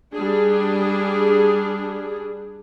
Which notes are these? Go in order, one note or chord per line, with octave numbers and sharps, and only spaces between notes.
G3 D4 G#4